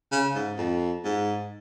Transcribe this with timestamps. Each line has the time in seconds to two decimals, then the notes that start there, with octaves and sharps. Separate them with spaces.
0.12 C#3
0.35 G#2
0.58 F2
1.04 G#2